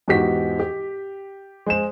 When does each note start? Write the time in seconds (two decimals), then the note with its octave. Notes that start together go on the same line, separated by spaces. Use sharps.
0.08 E2 G#2 F#4 G4 B6
0.60 G4
1.66 G#3 C5 E7